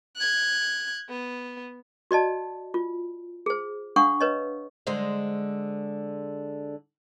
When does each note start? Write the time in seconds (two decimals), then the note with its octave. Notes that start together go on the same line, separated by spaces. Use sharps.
0.16 F#6 G#6
1.09 B3
2.11 F#4 D5 D#5 A5
2.74 F4
3.46 G#4 C5
3.96 D4 F5 F#5 C#6 D#6
4.21 B4 C#5 D#5
4.87 D3 G#3 C5